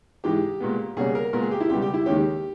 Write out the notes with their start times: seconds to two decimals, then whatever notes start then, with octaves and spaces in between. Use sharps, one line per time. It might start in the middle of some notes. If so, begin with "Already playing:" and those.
0.24 G#2 E3 G#3 G4
0.60 A#2 G#3 B3
0.97 B2 G3 A#3 C#4 G#4
1.15 A#4
1.33 A#2 G#3 B3 A#4
1.42 G#4
1.51 G4
1.60 E4
1.69 C#2 B2 G3 G4
1.82 G4
1.94 E4
2.06 D#2 D#3 G#3 C#4 G4